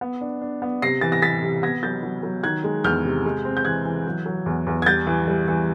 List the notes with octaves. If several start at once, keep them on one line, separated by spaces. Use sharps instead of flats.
B3
D4
D4
B3
C3 A#6 C7
E3 A6
A#6
E3 A6 B6
C3
B3 G#6 A#6
F#3 G6 A6
F#3
F#3
D#3 F#6 G#6
G#3
E2 F6 G6
C3
G#3
C4
G6
E3 F#6 G#6
E3
F#3
F#3
E2
E2
G#6
G3 G6 A6
E3
G3
E3